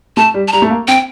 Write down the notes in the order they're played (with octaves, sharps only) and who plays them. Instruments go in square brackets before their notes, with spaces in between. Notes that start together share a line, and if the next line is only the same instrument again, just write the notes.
[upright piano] A3 [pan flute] A5
[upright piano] G3
[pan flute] A5
[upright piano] G3 [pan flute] A#5
[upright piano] A3
A#3
[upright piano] C4 [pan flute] G5